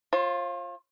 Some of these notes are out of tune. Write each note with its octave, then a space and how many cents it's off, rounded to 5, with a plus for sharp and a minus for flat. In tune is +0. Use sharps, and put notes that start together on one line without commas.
F4 +0 C5 +45